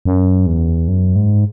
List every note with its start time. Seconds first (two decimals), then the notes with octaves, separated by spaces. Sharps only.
0.05 F#2
0.46 E2
0.88 F#2
1.16 G#2